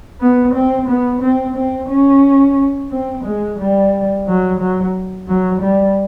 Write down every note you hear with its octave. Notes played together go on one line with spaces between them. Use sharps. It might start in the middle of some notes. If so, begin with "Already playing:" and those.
B3
C4
B3
C4
C4
C#4
C4
G#3
G3
F#3
F#3
F#3
G3